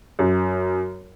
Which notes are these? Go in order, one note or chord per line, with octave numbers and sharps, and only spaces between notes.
F#2